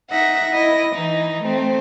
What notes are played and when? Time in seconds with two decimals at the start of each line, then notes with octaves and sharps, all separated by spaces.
0.12 D#4 E5 F#5 A#6
0.52 E4 D#5 A#6
0.96 E3 D#4
1.43 A3 C4